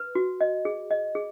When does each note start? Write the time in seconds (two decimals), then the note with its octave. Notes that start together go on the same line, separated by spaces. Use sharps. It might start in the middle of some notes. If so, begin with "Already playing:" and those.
Already playing: B4
0.15 F#4
0.41 D#5
0.65 G#4
0.91 D#5
1.15 G#4